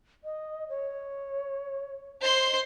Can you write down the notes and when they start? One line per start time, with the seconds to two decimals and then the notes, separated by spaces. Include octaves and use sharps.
0.24 D#5
0.69 C#5
2.22 C5 D#5 C6